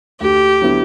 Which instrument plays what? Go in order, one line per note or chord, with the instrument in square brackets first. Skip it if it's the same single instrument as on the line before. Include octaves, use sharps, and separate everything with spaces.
[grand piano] D2 [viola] G4
[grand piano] D3 F#3 B3 E4